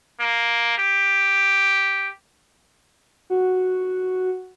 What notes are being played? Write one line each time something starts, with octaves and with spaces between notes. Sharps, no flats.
A#3
G4
F#4